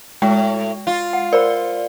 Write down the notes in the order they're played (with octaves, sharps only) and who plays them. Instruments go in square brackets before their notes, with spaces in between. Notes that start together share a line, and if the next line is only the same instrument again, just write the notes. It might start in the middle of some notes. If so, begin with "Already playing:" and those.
[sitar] A2 [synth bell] G#3 [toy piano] G5
[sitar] F4
[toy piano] F#5
[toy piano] A#4 C5 B5 [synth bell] D5